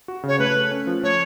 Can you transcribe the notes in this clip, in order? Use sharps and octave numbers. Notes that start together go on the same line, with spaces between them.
F#4
C#3 C#5
A3 B4
A3
C#4
F3
A3 C#5